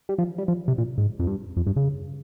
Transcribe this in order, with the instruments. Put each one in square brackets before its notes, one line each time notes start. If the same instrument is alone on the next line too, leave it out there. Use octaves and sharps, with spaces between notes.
[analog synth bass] G3
F3
G3
F3
C3
A#2
G#2
F2
G2
F2
G2
C#3